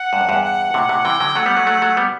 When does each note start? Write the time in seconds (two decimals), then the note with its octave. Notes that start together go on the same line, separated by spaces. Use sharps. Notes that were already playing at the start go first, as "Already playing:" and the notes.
Already playing: F#5
0.13 G2
0.21 F#2
0.29 E2 G2
0.44 F#5
0.74 A2 C3
0.89 A2 C3
1.05 C3 E3 G5
1.20 D3 F#3
1.35 F#3 A3 F#5
1.46 G3 B3
1.57 F#3 A3
1.67 F#3 A3
1.82 F#3 A3
1.97 G3 B3